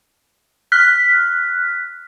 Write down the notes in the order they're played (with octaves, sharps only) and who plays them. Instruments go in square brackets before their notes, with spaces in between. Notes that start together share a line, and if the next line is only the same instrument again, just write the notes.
[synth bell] F6 F#6 B6